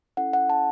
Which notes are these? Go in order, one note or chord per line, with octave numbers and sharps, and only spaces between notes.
C#4 E4 A4 F#5
F#5
A5